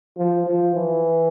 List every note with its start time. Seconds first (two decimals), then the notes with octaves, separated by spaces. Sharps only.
0.18 F3
0.47 F3
0.75 E3